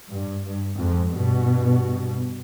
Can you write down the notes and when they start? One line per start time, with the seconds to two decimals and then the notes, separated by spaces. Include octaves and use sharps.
0.09 G2
0.44 G2
0.78 F2 G#2
1.13 G2 B2